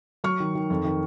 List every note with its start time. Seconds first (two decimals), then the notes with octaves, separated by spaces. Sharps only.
0.24 F#3 C#6 F6
0.40 D#3
0.55 D#3
0.70 F2
0.85 D#3